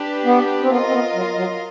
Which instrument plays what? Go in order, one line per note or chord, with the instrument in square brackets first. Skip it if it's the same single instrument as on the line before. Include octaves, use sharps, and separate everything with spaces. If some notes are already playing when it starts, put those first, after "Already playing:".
Already playing: [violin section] D4 G4 B4
[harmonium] B3
C4
[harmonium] B3 [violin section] F4 A#4 D#5
[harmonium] C4
B3
F#3
F#3